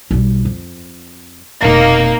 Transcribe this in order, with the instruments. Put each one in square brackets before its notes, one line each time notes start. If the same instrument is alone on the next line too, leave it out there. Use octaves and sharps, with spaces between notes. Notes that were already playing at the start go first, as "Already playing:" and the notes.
[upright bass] B1 G3
F2
[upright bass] F1 B2 [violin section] A#3 D#4